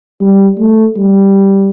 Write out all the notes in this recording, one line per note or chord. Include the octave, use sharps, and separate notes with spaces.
G3
A3
G3